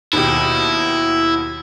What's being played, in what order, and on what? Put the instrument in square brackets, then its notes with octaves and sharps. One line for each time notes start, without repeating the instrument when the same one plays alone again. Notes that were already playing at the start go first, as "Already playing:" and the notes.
[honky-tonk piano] D#2 B2 G4 [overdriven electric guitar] E4